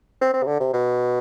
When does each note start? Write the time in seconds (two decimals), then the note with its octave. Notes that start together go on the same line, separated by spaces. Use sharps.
0.21 C4
0.33 C4
0.43 C3
0.47 D3
0.60 C3
0.73 B2